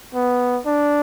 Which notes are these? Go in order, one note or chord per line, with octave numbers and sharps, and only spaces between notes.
B3
D4